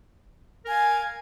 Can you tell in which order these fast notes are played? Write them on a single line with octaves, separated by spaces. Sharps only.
A#4 G#5 F5